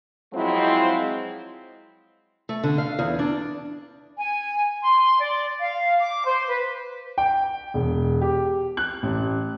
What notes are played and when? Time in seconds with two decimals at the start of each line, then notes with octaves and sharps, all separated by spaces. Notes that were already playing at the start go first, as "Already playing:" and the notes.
0.33 F3 F#3 G#3 C4 E4
2.49 A3
2.63 D3
2.78 F5
2.99 E2
3.19 D4
4.17 G#5
4.83 C6
5.20 D5
5.60 F5
5.99 D6
6.25 C5
6.48 B4
7.18 G5
7.74 E1
8.21 G4
8.77 F#6
9.03 A1